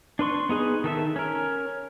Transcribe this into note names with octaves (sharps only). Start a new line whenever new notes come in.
D4 B4 C6 C#6
B3 D#4 G#4 B4
D#3 A4 E5
C#4 A#4